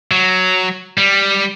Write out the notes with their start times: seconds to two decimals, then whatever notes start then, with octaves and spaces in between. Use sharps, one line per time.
0.11 F#3
0.98 G3